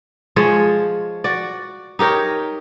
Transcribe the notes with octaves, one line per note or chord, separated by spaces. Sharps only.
F3 G#3 C#5
F#4 D5
D#4 G4 A#4 C#5